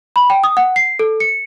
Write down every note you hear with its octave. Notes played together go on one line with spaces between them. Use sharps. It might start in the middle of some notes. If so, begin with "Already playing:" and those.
B5
G5
D#6
F#5
C7
A4
C#7